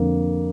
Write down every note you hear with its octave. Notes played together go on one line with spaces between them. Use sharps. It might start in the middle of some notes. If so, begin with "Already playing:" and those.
Already playing: F2 D3 A#3